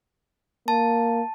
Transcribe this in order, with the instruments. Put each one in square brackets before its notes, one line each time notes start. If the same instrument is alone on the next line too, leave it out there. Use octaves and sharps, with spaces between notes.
[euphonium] A#3 [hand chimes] A5